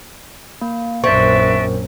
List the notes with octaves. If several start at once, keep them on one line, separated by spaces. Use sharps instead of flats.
A#3
A#1 F#2 C4 D4 B4 E5 C#6